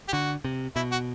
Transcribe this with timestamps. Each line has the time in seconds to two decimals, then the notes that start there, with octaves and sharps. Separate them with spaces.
0.08 G4
0.13 D3 F#4
0.44 C3
0.76 B2 E4
0.92 F#4